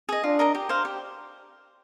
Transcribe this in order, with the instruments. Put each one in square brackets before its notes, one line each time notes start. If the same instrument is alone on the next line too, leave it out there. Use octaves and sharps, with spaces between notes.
[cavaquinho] G#4 D#5
[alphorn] D4 [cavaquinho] F4
[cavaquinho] A#4 D#5 A#5
G4
C5 F5
G4